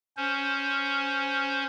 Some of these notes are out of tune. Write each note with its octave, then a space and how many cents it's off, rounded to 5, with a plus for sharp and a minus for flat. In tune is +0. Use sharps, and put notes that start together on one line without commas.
C#4 +0 C5 +0